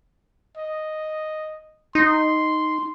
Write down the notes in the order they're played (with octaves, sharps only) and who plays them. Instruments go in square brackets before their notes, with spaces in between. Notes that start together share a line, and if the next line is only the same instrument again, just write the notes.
[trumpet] D#5
[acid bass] D#4 [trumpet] C6